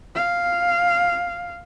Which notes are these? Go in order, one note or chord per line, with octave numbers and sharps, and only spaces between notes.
F5